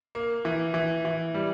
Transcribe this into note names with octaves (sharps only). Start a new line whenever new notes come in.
A#3
E3
E3
E3
G3